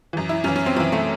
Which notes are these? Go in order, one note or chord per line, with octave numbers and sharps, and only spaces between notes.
F#2 E3
E4
F#2 E3 C#4
C#4
C4
F#2 E3 C4
A3